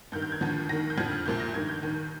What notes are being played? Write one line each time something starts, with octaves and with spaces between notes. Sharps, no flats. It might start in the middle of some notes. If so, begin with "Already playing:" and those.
G2 D#3 G6
G6
G#6
D#2 D3 F3
D#2 D#3 A#6
G6
F2 D3 F3 G#6
F6
C2 A#2 F3 G6
A#6
G2 D#3 G#6
G6
D#2 D#3